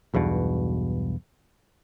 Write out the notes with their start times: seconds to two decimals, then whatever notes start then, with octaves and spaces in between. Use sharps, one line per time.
0.14 B1 E2 G2 B2